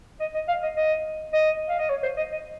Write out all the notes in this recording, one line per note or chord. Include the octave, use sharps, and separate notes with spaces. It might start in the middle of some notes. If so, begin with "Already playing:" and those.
D#5
D#5
F5
D#5
D#5
D#5
F5
D#5
C#5
C5
D#5
D#5